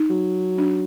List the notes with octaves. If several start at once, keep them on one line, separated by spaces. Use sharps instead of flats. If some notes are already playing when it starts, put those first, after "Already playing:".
Already playing: D#4
F#3
D4